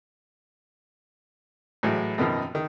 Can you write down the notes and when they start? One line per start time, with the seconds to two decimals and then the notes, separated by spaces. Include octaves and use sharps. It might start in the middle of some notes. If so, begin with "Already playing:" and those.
1.83 A2 E3 F#3 G#3 E4
2.18 F#2 B2 D#3 F3
2.55 D#3